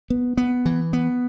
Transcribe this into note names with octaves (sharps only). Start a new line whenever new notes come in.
B3
B3
E3
B3